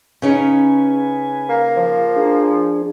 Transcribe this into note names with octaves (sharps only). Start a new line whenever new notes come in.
C#3 C#4 D#4 B4 G#5
A#3
F3
D4 G#4